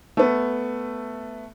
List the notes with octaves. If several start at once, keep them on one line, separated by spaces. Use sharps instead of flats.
A3 B3